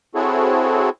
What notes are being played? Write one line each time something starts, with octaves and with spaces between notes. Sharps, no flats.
C4 E4 F#4 G#4 A4 C#5